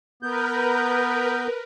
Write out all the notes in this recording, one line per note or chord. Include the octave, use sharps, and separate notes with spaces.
B3 A#4 B4 G6